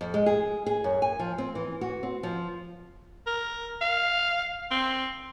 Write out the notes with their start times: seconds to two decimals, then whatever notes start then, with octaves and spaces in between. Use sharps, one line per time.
0.01 F2
0.14 G#3
0.26 G#4
0.66 G#4
0.84 F#2
1.02 G#5
1.19 F3
1.38 C4
1.55 E3
1.81 F#4
2.03 C4
2.23 F3
3.26 A#4
3.82 F5
4.71 C4